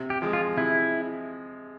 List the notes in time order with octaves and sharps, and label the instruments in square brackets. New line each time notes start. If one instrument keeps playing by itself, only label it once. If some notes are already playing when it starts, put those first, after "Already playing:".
Already playing: [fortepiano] C3
[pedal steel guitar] G4
[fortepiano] F3 G#3
[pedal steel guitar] F4
[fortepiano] C3 [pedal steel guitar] E4